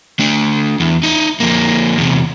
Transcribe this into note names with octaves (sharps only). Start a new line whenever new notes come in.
A3 D4
E2
D#4 E5
F2 A#3
E2 C3